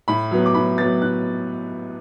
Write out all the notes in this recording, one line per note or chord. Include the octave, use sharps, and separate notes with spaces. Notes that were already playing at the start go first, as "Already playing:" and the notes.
A2 B5
F#3 B3
D6
A2 B5
F#3 B3 A6
A2 F#6